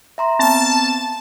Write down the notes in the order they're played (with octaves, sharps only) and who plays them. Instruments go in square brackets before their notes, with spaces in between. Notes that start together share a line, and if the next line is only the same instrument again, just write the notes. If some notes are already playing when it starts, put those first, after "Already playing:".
[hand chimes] E5 A#5 C6
[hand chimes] B3 C4 [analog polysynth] A5